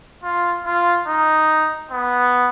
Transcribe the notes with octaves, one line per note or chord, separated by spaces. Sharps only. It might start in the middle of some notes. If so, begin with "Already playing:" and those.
F4
F4
D#4
B3